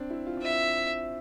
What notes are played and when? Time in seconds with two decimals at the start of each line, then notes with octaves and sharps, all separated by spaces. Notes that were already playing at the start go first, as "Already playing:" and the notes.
Already playing: C4 D4
0.10 E4
0.27 F4
0.37 D4
0.43 C4 E5